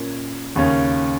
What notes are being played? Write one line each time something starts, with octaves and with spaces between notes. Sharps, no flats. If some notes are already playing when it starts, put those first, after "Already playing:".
Already playing: A#2 A#3 C#4
D#2 C#3 A#3 C#4